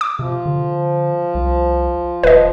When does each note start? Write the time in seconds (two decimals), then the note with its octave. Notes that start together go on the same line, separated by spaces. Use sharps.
0.01 D6
0.19 C3 F3
0.46 D3
1.35 C2
2.24 D#1 B4 D#5